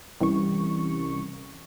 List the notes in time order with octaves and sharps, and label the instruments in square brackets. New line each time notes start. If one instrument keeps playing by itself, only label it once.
[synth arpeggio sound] C2 E3 C#4 C#6